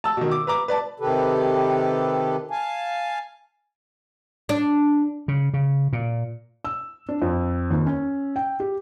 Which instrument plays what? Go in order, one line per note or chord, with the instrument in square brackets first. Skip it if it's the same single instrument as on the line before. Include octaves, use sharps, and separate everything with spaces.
[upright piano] A5 E6
B2 D#3
D6
B4 A#5 D6
B4 D5 A5
[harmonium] C3 D#3 G4 A4 B4
F5 G#5 A5
[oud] D4
[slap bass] C#3
C#3
A#2
[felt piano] E6
D4
F2
D#2
C#4
G5
G4